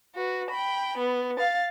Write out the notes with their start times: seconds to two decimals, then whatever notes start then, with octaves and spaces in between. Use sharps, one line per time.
0.15 F#4 B4
0.50 G5 B5
0.98 B3
1.38 F5 A6